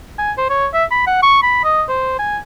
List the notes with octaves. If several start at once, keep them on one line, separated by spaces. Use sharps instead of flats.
G#5
C5
C#5
E5
B5
F#5
C#6
B5
D#5
C5
G#5